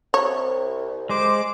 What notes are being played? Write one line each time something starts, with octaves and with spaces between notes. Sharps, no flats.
C2 C#5
G#3 C5 D6